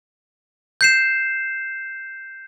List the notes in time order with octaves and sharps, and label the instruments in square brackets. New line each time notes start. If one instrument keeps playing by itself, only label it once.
[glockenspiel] G6 C7 E7